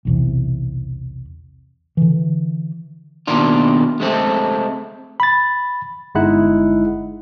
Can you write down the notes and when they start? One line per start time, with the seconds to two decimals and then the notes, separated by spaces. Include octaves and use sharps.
0.05 B1 E2 C3
1.97 D3 E3
3.27 B2 D#3 A#3 D4 F4
4.00 G#3 A3 C4 A4
5.20 B5 A6
6.15 G1 G#3 D#4 E4 F#5 F#6